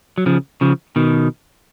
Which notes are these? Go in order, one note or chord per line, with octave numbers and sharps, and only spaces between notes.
F#3
C#3 F3
C#3 F3
B2 D#3